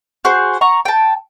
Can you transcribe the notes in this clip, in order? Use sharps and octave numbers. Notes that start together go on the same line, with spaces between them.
F#4 G#4 C5
F#5 A#5 C#6
G5 A5